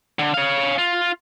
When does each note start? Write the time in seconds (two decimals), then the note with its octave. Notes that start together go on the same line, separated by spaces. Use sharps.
0.19 D3
0.34 C#5 F5
0.78 F4